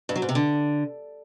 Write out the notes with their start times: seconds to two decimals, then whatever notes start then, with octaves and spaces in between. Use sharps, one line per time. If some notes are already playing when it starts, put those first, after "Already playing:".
0.09 G2
0.16 F#3
0.22 G#2
0.29 C3
0.35 D3